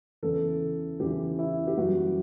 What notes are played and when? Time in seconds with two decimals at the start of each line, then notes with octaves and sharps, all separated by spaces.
0.22 E2 C#3 E3 A4
1.00 E2 C#3 E3 G4
1.39 E4
1.67 G4
1.77 F#2 E3 G3 F#4